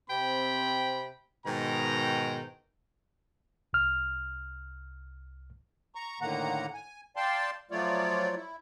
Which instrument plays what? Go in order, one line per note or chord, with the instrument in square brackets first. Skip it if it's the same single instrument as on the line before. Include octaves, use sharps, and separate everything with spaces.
[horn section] C3 C4 G5 B5
G#2 B2 D#3 G5 A#5
[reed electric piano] C2 F6
[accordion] A#5 C#6
A2 D3 D#3 A#3 F#5 A#5
G#5
D5 F5 G5 A5 C6
F3 F#3 A3 F4 C#5 D5
E4